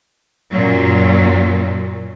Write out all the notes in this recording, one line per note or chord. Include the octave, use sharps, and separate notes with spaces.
F#2 A#2 F#3